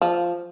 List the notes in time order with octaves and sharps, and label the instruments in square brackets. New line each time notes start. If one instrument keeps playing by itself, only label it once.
[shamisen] F3